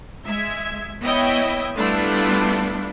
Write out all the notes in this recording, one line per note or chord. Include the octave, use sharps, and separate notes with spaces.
G#3 E5 G#6
B3 E4 C#5 D#5 E5 G5
G3 A3 B3 D4 E4 F4